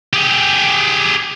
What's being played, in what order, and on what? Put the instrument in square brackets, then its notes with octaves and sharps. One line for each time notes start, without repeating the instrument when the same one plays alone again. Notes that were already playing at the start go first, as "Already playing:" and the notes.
[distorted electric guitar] G4 G#4